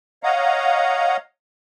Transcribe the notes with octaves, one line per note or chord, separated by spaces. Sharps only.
C#5 D#5 F5 F#5 A#5